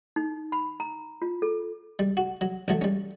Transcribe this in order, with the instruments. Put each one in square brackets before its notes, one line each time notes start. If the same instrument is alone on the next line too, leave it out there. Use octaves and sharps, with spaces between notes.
[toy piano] D#4
B5
A#5
F4
A4
[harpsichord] G3
F#4
F#3
A1 F#3 A3
G3 C#4